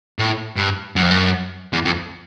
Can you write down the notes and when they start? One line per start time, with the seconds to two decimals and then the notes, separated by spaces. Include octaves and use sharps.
0.19 A2
0.57 G2
0.96 F#2
1.03 F2
1.11 F#2
1.73 E2
1.85 F2